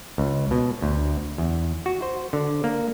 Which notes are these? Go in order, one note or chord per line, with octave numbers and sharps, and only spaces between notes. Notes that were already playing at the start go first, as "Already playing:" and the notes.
C#2
B2
D2
E2
F#4
C5
D3
A#3